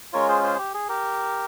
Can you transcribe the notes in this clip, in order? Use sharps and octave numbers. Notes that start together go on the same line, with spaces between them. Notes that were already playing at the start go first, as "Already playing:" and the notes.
G#3 C#4 F4 A#4 C#5
G#4 C5
G#4 C5
G4
G#4
G4 A#4